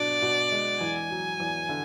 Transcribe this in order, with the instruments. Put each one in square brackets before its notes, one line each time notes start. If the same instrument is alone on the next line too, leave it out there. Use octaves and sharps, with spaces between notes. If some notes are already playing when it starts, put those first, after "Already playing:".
Already playing: [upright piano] B2 D4 [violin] D5
[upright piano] B2
G#3
[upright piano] E2 [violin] G#5
[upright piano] F#3
E2
D3